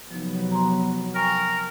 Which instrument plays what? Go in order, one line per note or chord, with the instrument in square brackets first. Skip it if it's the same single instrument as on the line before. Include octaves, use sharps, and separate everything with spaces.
[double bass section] F1 F#3 B3 [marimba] F3 D#4
[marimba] A#5 C6
[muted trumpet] A#4 [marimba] G5 G#5 C#6